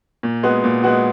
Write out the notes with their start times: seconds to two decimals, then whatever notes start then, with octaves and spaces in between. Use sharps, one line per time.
0.23 A#2
0.43 G#3 B3 F#4
0.64 A#2
0.84 G#3 B3 F#4